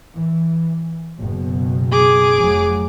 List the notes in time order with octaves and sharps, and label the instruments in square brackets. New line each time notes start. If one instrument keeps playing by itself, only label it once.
[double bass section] E3
F#1 B2
[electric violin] G#4 D6
[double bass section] F1 F#3